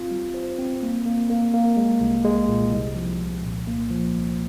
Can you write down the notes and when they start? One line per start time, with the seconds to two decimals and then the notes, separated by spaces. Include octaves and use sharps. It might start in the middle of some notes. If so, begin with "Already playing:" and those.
Already playing: C4 F4
0.11 G3
0.34 C5
0.59 C4
0.82 A#3
1.06 A#3
1.30 A#3
1.54 A#3
1.77 G#3
2.01 C2
2.25 G#3
2.48 A#2
2.72 C2
2.95 F3
3.20 C2
3.43 A#2
3.67 A#3
3.90 F3
4.15 C2